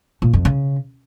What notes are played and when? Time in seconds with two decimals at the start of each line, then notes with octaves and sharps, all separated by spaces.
0.22 A#2
0.33 F2
0.45 C#3